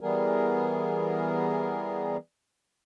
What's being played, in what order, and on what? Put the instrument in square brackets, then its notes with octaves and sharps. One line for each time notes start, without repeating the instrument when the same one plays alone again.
[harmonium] E3 G3 B3 G#4 A#4